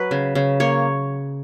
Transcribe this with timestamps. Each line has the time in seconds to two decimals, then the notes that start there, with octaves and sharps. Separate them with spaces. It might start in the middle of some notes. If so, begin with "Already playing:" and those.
Already playing: F#3 B4
0.11 C#3
0.35 C#3
0.60 A#3 C#5